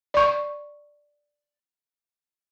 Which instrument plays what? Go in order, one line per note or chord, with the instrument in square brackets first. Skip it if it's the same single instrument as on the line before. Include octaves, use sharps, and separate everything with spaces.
[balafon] D5 C#6